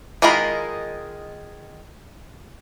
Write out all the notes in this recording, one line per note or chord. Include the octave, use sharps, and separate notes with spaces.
D#3 G#3 F4 A#4 B5